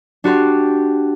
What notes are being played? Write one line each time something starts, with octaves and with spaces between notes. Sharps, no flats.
D4 F#4 G4 C6